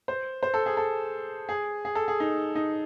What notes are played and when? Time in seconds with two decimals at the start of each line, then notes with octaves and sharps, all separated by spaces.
0.08 C5
0.43 C5
0.54 A4
0.66 G#4
0.77 A4
1.49 G#4
1.85 G#4
1.95 A4
2.08 G#4
2.20 D#4
2.55 D#4